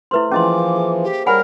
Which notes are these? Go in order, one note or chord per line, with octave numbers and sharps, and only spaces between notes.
A3 E4 B4 C5 C6
E3 F3 A#3 C#4 G#4 D#5 C6 D6
C5
G#4
G4
G3 A#4 C#5 F#5 G#5 B5